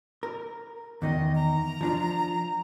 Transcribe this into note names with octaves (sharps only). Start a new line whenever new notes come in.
A#4
E2 D#3 D#5
A#5
F3 D4 F4